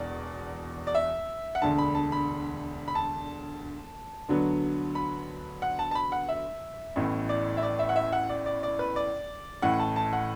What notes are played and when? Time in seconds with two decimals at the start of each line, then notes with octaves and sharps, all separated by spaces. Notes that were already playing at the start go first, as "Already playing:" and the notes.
Already playing: E1 E2 B2 D5
0.87 D5
0.95 E5
1.55 F#5
1.61 E1 D2 D3 A5
1.78 B5
1.95 A5
2.12 B5
2.88 B5
2.95 A5
4.29 D2 D3 F#3 B3
4.95 B5
5.62 F#5
5.79 A5
5.91 A5
5.95 B5
6.12 F#5
6.28 E5
6.96 A1 A2 E3 B3
7.29 D5
7.57 E5
7.63 D5
7.79 E5
7.89 F#5
7.96 E5
8.12 F#5
8.29 D5
8.46 D5
8.63 D5
8.79 B4
8.96 D5
9.62 A1 A2 E3 F#5
9.79 A5
9.96 A5
10.13 F#5